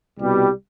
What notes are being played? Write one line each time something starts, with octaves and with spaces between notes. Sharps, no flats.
C2 B2 G3